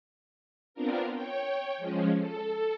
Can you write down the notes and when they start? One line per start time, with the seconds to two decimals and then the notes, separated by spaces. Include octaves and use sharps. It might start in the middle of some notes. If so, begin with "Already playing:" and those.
0.74 B3 C4 D4 F4 A#4
1.12 C#5 G5
1.78 F3 G#3 C#4
2.18 A4